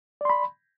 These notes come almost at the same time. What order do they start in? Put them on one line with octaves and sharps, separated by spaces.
D5 C6 B5